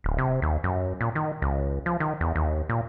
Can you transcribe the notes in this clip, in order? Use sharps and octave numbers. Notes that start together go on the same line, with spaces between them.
D1
C3
D#2
F#2
A#2
D#3
C#2
F3
D#3
E2
D#2
A#2